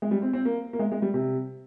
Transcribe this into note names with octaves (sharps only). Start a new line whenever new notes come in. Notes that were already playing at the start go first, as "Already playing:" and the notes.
G#3
G3
C4
C4
A#3
A#3
G#3
G#3
G3
C3